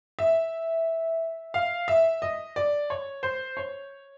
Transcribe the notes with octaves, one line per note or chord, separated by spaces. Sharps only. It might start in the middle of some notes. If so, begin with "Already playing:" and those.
E5
F5
E5
D#5
D5
C#5
C5
C#5